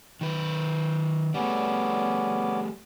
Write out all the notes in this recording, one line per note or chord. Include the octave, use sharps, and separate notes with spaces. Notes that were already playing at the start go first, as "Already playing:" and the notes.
D#3 B4 G5
G3 A3 B3 C#4 D5